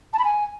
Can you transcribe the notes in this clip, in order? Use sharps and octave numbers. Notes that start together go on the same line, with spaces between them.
A5
B5
G#5